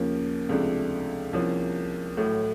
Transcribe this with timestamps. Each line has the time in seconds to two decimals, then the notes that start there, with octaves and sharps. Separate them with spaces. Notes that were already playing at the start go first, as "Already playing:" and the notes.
Already playing: D#2 C#3 F3 A#3 C#4
0.49 C#2 C3 F3 A3 D4
1.33 C2 C3 F3 A#3 C#4
2.17 A1 A2 F#3 A3